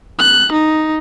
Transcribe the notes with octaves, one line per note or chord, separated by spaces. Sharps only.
F#6
D#4